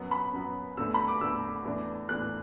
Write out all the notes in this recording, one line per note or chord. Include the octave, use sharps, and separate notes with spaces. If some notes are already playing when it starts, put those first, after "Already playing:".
Already playing: F#2 F#3 B3
B5
F#2 F#3 B3
E2 D3 A3 E6
B5
D6
E2 D3 A3 E6
E2 E3 A3 D4
E2 E3 A3 D4 F#6